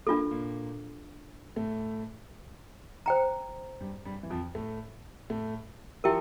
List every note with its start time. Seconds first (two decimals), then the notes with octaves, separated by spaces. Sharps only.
0.07 A#3 D4 F4 A4
0.31 A#2 A#3
1.56 A2 A3
3.06 C5 G5 A#5
3.80 G2 G3
4.05 G2 G3
4.23 E3
4.30 F2 F3
4.55 A2 A3
5.30 A2 A3
6.04 F3 E4 G4 A#4 E5 G5